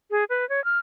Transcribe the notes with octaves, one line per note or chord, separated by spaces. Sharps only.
G#4
B4
C#5
F6